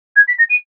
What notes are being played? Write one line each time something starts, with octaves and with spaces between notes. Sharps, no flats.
G#6
B6
A#6
D#7